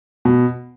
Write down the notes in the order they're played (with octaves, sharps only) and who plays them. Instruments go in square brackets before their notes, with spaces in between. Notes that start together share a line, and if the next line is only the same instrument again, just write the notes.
[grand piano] B2